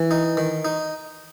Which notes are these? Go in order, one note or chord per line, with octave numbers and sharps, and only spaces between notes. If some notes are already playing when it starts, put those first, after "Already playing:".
Already playing: E3
D#4
D#3
D#4